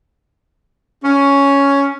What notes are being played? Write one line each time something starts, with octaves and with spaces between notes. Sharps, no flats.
C#4